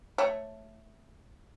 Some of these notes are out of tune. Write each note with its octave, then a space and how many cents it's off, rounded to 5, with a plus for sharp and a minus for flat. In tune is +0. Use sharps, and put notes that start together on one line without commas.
A3 +0 C#5 -5